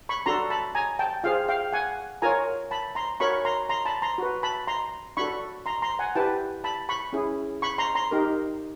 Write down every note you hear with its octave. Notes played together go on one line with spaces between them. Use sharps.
B5 C#6
D4 F#4 A4 A#5 C6
A5 B5
G#5 A#5
G5 A5
F4 G#4 C5 F5 G5
F5 G5
F#5 G#5
F4 A#4 C#5 G#5 A#5
A5 B5
A#5 C6
F#4 A#4 C#5 B5 C#6
A#5 C6
A#5 C6
A5 B5
A#5 C6
F#4 B4
A5 B5
A#5 C6
D4 F#4 A4 B5 C#6
A#5 C6
A#5 C6
F#5 G#5
E4 G4 B4 G5 A5
A5 B5
B5 C#6
C#4 E4 G#4
B5 C#6
A#5 C6
A#5 C6
D#4 G4 A#4